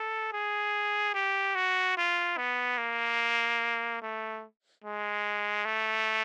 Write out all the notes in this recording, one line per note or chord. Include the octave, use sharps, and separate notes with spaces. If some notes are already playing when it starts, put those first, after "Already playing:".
Already playing: A4
G#4
G4
F#4
F4
B3
A#3
A3
G#3
A3